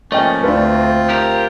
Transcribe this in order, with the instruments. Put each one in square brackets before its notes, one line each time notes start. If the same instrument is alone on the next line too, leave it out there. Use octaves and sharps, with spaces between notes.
[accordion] F3 A#3 C#4 [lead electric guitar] A3 [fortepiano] D#5 G5
[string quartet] D2 [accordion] C4 F4 [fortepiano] D4 B4
[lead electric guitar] G4 A#4